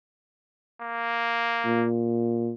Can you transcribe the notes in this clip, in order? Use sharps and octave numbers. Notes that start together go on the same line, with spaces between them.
A#3
A#2